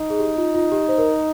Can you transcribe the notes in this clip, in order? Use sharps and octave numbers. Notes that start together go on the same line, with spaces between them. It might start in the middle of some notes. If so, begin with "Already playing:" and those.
Already playing: D#4
G#4
G4
F4
F4
G4
C5
A#4